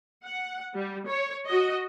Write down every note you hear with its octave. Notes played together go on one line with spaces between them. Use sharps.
F#5
G3
C#5
F#4 D#5